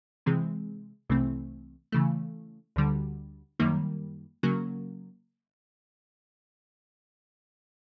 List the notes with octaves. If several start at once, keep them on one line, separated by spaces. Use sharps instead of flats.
C3 E3 G#3 C4
C2 C3 E3 A3 C4
C#3 E3 A3
D2 D3 G3
F#2 D#3 G3 A#3
C#3 F#3 A#3